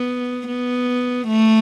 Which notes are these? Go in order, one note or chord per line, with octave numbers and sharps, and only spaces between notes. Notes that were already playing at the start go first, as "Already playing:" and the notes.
Already playing: B3
B3
A3